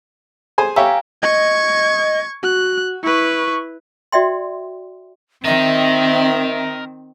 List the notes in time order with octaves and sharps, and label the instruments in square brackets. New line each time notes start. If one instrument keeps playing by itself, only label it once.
[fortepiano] G#4 C5 G#5
[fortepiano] G4 C#5 E5 [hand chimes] F5 G#5 A#5
[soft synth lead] D#5 [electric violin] C#6 G#6
[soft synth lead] F#4 [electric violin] F#6
[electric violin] E4 B4 [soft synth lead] C#6
[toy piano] F#4 D5 E5 G5 C6
[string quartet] D#3 [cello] C4 [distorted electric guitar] A#4 D#5 [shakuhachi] E5